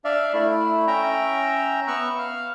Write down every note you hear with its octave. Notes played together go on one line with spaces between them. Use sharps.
D4 D5 E5 F5
A3 E4
C#4 E5 G5 A#5
B3 C#6 E6 F#6
F5